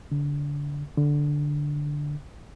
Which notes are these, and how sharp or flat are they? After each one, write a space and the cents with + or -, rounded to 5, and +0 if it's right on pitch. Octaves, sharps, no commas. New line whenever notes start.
D3 -30
D3 -5